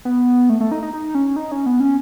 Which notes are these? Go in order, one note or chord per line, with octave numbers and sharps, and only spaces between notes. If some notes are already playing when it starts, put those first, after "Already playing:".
B3
A3
A3
D#4
D#4
D#4
C#4
D#4
C#4
B3
C#4